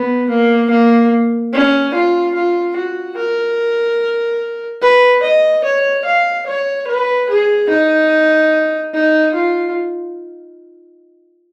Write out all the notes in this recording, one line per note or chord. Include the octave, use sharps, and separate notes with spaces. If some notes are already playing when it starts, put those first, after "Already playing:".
Already playing: B3
A#3
A#3
C#4
F4
F4
F#4
A#4
B4
D#5
C#5
F5
C#5
B4
G#4
D#4
D#4
F4